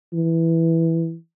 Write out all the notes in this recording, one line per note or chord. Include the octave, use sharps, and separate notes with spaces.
E3